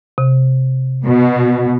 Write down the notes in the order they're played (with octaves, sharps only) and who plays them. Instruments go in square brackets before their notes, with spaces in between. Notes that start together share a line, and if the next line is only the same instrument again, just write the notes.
[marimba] C3
[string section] B2